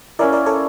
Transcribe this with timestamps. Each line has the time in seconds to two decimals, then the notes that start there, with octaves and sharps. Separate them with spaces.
0.19 A#3 C#4 E4 A#4 D5
0.33 A#4 D5
0.46 A4 C#5